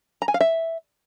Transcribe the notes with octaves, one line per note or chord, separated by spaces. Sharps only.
A#5
G#5
F5
E5